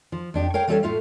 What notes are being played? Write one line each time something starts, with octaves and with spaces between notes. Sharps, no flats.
F3
F2 D4 G4
A#4 C#5 F5 G5
E3 G3 C#4 A4 C#5 F5
A2 A3 F4 E5 F5